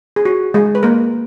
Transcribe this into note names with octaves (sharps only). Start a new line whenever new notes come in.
G#4
F#4
G#3 G#4
B4
A#3 A#4